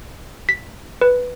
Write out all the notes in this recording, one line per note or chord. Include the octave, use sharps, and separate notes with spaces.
B6
B4